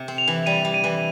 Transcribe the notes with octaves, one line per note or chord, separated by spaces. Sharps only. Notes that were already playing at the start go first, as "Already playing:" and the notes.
Already playing: C3
C4
F7
E3
G3 D#7
G3
D#7
E3